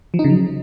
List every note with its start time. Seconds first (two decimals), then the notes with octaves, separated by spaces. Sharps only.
0.14 F3
0.19 D#4
0.24 C#3
0.30 F#3